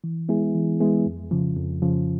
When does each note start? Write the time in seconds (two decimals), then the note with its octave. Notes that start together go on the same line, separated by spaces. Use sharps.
0.04 E3
0.29 G#3 B3 E4 G#4
0.54 E3
0.80 G#3 B3 E4 G#4
1.06 F2
1.31 C#3 F3
1.57 F2
1.82 C#3 F3